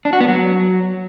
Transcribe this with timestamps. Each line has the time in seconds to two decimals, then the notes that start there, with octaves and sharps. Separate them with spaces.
0.05 D4
0.13 F#4
0.21 B3
0.28 F#3